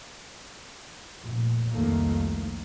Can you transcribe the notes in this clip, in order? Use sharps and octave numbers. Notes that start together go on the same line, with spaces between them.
F1 A#2
F1 C2 F2 D#3 A3 A#3